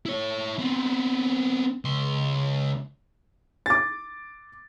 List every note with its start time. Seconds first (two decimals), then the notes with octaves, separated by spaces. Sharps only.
0.06 E4 C#5
0.59 B3 C4
1.85 C#2 C6
3.66 D6 A6